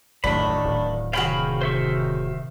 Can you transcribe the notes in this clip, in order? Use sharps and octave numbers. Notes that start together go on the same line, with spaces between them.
E1 A1 F#2 A2 D#3 D4 B5
D1
C3 D#3 F#4 G#4 C#5 F5 G5 B5
C5 E5 C#6